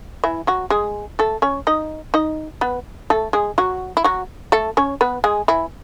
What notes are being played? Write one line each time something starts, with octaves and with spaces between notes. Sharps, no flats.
E3 E4
F#3 F#4
G#3 G#4
A3 A4
C#4 C#5
D#4 D#5
D#4 D#5
B3 B4
A3 A4
G#3 G#4
F#3 F#4
E4
F#3 F#4
A3 A4
C#4 C#5
B3 B4
G#3 G#4
E3 E4